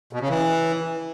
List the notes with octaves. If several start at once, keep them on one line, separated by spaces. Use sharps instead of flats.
B2
C#3
E3